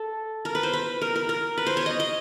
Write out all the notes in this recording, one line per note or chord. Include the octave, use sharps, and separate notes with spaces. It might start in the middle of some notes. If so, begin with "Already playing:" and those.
Already playing: A4
A#4
B4
C5
B4
A#4
A#4
A#4
B4
C5
C#5
D#5
D#5